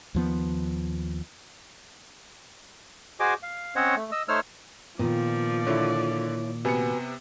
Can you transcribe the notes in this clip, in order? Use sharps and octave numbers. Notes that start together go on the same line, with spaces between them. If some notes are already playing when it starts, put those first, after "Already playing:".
D#2 F3 B3
F#4 G#4 C5 D#5 G#5 D6
F5
C4 C#4 C5 C#5 D#5 F#5
A3
D#5 E6
A3 D#4 C5 C#5 E6 F6
A#2 D#3 F3 B3 D5
D3 E4 C#5
C3 B3 F#4 B4 G#5 C#7